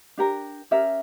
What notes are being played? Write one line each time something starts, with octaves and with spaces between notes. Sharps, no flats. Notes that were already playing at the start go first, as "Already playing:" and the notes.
D4 G4 A#4
C#4 G4 A#4 E5